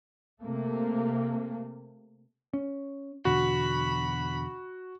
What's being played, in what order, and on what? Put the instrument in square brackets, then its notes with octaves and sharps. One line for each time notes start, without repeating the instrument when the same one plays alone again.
[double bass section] C3 A3 A#3
[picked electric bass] C#4
[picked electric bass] E2 B2 D3 [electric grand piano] F#4 [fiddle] B5